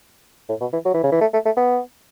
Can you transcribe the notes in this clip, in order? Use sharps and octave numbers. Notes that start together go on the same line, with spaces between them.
A2
B2
E3
F#3
E3
C#3
E3
A3
A3
A3
B3